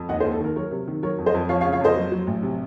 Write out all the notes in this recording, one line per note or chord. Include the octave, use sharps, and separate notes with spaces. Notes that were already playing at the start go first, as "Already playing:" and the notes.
Already playing: F2
D#2 D#5 F#5
C5 D#5
D#2
A4
D#3 A#4
F#3 A#4 C#5
C3
D#3
F#3 A#4 C#5
F2
C5 D#5
F2
F3 C#5 F5
C#5 F5
C#3
C#5 F5
F2 C5 D#5
F#3
F#3
A1
C3